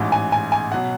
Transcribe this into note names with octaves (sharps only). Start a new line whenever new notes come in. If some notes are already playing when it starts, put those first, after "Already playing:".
Already playing: A1 G#2 E3
G#5
G#5
G#5
B2 F#3 F#5